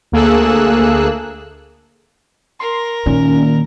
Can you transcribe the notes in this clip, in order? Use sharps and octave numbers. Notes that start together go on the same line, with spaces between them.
D2 A#3 G#4 A4 E6 F#6
A#4 C6
A#2 D#3 C#4